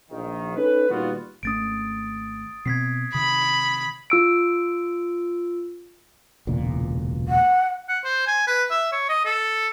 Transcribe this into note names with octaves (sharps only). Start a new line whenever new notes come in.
A#1 D#3
C#4 D#4 A4 B4
A#2 D#3 G3 B3 F4 F#4
G#1 A3 C#4 D#6 A6 D7
B2 C4 G#6 B6 C7
C3 D#3 B5 D#6
F4 E6 D7
E1 C#2 A#2
F#5
F#5
C5
G#5
B4
E5
C#5
D#5
A4